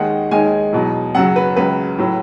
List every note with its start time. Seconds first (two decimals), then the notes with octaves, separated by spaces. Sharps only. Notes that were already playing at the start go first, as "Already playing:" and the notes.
Already playing: D#2 D#3 G#3 F#5
0.31 D#2 D#3 G#3 G#5
0.73 E2 B2 F#3
1.15 F#2 C#3 F#3 F#5
1.36 B4
1.56 C#2 C#3 F#3 B4
1.98 A2 F#3